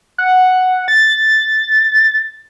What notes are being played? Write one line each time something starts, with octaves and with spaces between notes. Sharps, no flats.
F#5
A6